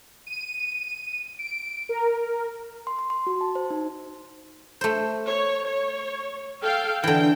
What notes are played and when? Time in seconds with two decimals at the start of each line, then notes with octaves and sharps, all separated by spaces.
0.27 D#7
1.39 D7
1.89 A#4
2.87 C6
2.99 C6
3.10 C6
3.27 F#4
3.41 A5
3.55 C5
3.71 D#4
4.81 A3 C5
5.27 C#5
5.67 C#5
6.61 A4 F5 G5
7.04 D3 E3 G5